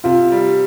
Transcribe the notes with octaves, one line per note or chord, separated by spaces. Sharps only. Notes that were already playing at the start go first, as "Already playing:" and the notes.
C3 F4
G3